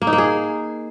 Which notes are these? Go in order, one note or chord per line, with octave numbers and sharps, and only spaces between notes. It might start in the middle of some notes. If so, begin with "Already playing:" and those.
A#3
D#4
A#3
G#4